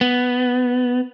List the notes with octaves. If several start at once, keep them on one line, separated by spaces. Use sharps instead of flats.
B3